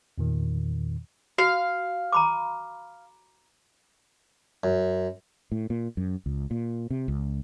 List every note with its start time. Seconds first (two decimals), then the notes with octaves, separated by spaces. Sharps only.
0.18 E2 A#2 D#3
1.38 F#4 F5
2.12 A#5 B5 D6
4.64 F#2
5.52 A2
5.70 A#2
5.97 F#2
6.26 C#2
6.51 A#2
6.90 C3
7.08 C#2